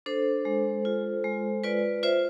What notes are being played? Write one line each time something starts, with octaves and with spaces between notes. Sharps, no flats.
D4 A4 C5
G#3
F4
G#3
F4 B4 D5
F4 C5 E5